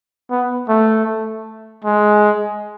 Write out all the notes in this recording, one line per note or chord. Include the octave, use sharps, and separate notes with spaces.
B3
A3
G#3